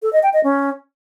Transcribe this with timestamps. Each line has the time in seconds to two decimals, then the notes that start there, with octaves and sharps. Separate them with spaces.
0.02 A4
0.13 D#5
0.23 G5
0.33 D#5
0.44 C#4